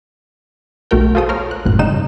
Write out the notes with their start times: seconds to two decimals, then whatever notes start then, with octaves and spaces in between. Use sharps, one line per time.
0.91 B1 A3 F#4 A#4 G5
1.15 F4 F#4 G#4 A4 C5 D#6
1.29 A#4 C5 C#5 F6
1.51 F#6
1.65 G1 F#2 A2 F#6
1.79 G#2 C#3 G3 D#4 E7